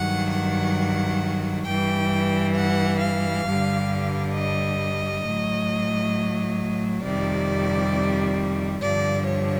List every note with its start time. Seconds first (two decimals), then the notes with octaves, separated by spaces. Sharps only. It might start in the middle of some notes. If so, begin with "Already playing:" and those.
Already playing: G2 D#3 F#3 F#5
0.32 F#5
1.66 G2 E3 G3 G5
2.55 F#5
3.01 F5
3.45 G2 D3 G3
4.34 D#5
5.24 A2 F#3
7.04 F2 C3 D#3 G3 D5
8.82 G2 D3 F3 D5
9.28 C#5